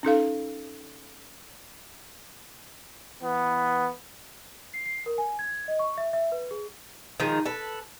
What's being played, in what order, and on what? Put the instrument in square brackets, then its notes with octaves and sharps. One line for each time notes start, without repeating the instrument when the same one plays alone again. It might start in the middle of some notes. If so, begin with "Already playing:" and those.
[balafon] C#4 D#4 A4 F5
[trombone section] E3 B3
[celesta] C7
C7
A#4
G#5
G#6
D#5
C#6
E5
E5
B4
G#4
[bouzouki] D#3 F3 G#3 D#4
A4 B4